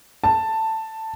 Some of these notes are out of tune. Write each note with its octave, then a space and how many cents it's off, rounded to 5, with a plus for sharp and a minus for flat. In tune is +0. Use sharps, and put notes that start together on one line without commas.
A5 +10